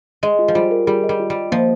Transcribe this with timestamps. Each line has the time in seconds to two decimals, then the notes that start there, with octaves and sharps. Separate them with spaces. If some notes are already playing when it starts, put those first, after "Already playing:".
0.23 G#3 D#5
0.39 F4
0.48 F3
0.55 G3 F4
0.71 A#4
0.87 G3 G#4
1.04 D#5
1.09 G3
1.20 F4
1.30 G3
1.35 D#5
1.52 F3 A#3